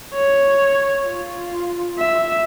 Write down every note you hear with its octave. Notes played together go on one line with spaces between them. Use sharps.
C#5
F4
E5